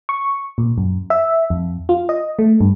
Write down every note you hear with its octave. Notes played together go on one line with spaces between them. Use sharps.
C#6
A#2
F#2
E5
F2
F4
D#5
A3
G2